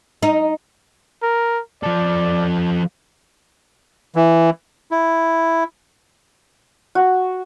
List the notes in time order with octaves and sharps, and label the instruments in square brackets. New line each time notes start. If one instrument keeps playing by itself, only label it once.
[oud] D#4
[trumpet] A#4
[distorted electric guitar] F3 A4 [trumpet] D5
[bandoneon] E3
[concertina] E4
[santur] F#4